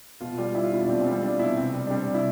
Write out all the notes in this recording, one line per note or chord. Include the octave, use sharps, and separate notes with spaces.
B2 F4
G3 F4
G3 E4
F4
B2 E4
D4
B2 C4
C4
G3
C4
G3 D4
B2 E4
C3 C4
G3
D4
G3 C4
C3
E4